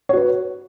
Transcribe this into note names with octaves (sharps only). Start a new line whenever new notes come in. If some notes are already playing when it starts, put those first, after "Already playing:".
F#4 B4 C#5